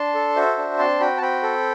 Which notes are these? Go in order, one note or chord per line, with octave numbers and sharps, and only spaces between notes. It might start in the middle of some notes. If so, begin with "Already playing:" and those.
Already playing: D4 A5 C6
A4
F#4 C5 E5
D4
C4 A5 C6
F#4 G5 B5
A5
C4 G5 B5
A4